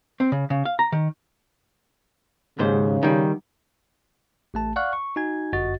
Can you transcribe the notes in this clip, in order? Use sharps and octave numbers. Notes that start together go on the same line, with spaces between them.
C4
C#3
C#3
F5
A#5
D#3
D#2 G#2 C#3 C5
D#3 G3
A1 A3 A5
D5 F5 F#5 C#6 F6 F#6
C#6
D#4 F#4 G#5 G#6
G1 F#2 F#4 D#5 A6